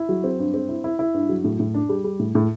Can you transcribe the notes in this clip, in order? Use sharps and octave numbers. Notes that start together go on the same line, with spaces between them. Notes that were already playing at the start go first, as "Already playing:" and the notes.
Already playing: E4
F#3
C4
G2
C4
E4
E4
E4
G2
F#3
A2
A2
D4
G3
G3
A2
A2